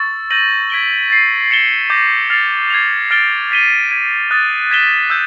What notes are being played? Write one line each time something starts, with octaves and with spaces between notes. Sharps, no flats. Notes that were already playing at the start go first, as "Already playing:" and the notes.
Already playing: C#6 E6 A6
G6 A#6 D#7 F#7
G#6 B6 D7 G7
A6 C7 D#7
A6 C#7 E7 G7
D6 G6 A#6
F6 A6 C7 F7
G#6 C7 F7
F6 A6 D7 G7
G#6 B6 D#7 G7
G#6 B6 D#7
D#6 F#6 A6
G#6 B6 E7 G7
E6 G6